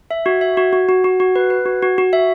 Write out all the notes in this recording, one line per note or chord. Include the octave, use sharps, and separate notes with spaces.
E5
F#4
E5
F#4
F#4
F#4
F#4
F#4
B4
B4
F#4
F#4
F#4
E5